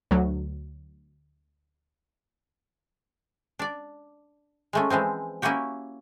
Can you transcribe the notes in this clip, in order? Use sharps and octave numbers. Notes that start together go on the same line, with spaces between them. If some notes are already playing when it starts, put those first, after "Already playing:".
D2 F#3
D4 D5
G#3 A3 C#4
E3 F3 G#3 C4
A#3 C#4 E4 F#4 G4